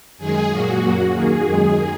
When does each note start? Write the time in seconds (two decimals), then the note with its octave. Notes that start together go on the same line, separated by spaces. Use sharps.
0.18 F#2 D#3 G#3 G#4
0.50 A#2 F#3 A#3 F#4
0.81 F#2 F#3 A#3
1.13 D#2 D#3 A#3 G#4
1.45 F#2 D#3 G#3